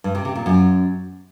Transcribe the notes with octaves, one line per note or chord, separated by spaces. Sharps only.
G2
C3
C3
A#2
F#2